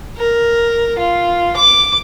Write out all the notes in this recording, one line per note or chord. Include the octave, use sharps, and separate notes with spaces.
A#4
F4
D6